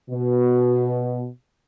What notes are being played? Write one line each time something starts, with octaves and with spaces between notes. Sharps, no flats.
B2